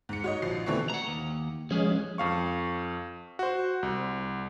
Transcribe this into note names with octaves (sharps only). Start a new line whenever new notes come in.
G#2 C#7
F#4 C#5 D#5
A#1 F3 C7
B2 D3 E3 A3 C4 C#6
F#5 A#5
D#2
F3 G#3 C#4 G#4 B4
F2 F5 C#6
F#4 C5
C2